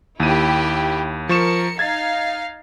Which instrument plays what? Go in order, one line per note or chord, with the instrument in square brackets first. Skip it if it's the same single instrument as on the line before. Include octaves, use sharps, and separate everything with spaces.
[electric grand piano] D#2 D#7 [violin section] E4 G4
[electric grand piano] F3 C#6 E7 [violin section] A#4 C#7
[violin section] D#4 F5 [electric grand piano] G#6 A6